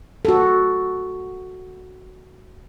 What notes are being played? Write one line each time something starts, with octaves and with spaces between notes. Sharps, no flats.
F#4 A4